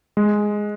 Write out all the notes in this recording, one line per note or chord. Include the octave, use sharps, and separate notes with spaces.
G#3